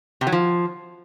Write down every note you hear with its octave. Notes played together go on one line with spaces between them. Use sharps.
C3
F#3
F3